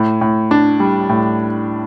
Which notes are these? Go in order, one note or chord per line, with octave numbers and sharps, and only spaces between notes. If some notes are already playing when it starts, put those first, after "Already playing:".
Already playing: A2
A2
D4
G3
A2